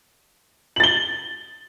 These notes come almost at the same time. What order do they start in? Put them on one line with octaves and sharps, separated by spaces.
F#7 A6 G7